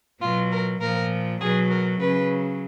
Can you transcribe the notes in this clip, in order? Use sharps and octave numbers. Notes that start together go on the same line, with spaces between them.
B2 F#3 F4
A#4
A#2 F3 A#4
B2 F#3 G#4
A#4
C#3 F#3 B4